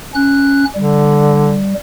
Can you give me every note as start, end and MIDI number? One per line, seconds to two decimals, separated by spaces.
0.15 0.65 61
0.15 0.65 90
0.75 1.58 50
0.75 1.74 55